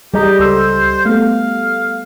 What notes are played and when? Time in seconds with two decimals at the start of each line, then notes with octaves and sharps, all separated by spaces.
0.14 G3 G4 G#4 D#5 A#5
0.39 C#2 A4 C5 E6
1.05 A3 B3 F5